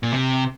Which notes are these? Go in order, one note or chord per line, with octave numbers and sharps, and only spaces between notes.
A#2
C3